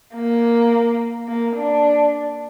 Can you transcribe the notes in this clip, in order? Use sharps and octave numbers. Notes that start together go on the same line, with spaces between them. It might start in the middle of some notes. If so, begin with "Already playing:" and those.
A#3
A#3
D4